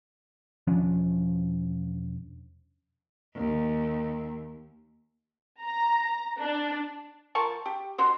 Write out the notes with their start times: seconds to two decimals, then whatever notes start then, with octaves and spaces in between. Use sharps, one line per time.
0.67 E1 F3 C#4 D4
3.36 D#2
5.63 A#5
6.40 D4
7.35 F3 A#4 A5 C#6
7.66 G4
7.98 B2 F#4 C5